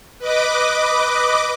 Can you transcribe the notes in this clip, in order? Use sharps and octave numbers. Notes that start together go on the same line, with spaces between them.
B4 D#5 D6